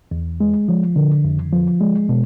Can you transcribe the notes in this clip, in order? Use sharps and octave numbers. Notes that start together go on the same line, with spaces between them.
E2
G#3
F3
D3
F2
F3
G#3
B2